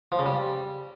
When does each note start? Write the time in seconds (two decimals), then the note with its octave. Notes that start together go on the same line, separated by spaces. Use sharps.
0.12 F3
0.19 C#3
0.26 G3